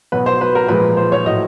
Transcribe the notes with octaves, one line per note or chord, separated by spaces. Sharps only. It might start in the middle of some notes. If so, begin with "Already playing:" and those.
B2 F#3 B4
C5
B4
A#4
A#2 F3 G#3 B4
C5
C#5
A2 F#3 D#5